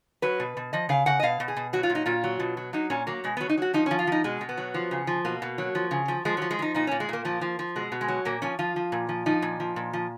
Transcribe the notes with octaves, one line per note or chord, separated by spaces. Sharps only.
F#3 B4
B2
B2
F3 D#5
C#3 F5
C#3 F#5
D#5
B2 F5
B2
G#4
B2
F#3 F#4
F4
A#2
D#4
A#2 F4
F#3
B2
F#3
F#3 D#4
A#2 C#4
F#3 A#3
B2 G#3
B3
F#3
D#4
F#3 F#4
F3 D#4
C#4
F3
F4
F3 D#4
B2 G#3
B2
B3
F#3
F3
C#3
F3
B2 A#3
B2
F#3
F3
C#3
F3
F3 G#3
F#3
F3
G#3
F3 D#4
A#2 D#4
C#4
A#2
G#3
A#2 A#3
F3 A#3
F3
F3
B2 G#3
B2
G#3
F#3
A#2 A#3
F3 C#4
F3 F4
F3
A#2
F3
F3 D#4
A#2
F3
A#2
F3